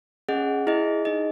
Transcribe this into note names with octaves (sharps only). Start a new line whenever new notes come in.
C#4 G#4 D#5 F#5
E4 G#4 D#5
D#4 G#4 D#5